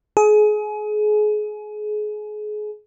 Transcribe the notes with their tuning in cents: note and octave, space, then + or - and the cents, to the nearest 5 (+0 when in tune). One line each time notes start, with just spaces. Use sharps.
G#4 +30